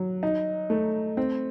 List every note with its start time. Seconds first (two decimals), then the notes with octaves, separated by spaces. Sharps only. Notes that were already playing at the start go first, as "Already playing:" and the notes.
Already playing: F#3
0.23 D#4
0.70 A3
1.17 C4